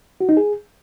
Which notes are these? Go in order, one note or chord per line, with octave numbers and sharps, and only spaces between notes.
F#4
D#4
G#4